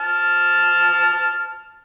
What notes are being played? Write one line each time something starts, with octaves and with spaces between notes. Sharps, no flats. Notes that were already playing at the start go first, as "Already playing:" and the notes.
A5 F6